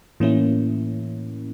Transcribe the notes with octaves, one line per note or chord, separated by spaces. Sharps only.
A2 E3 A#3 C#4 E4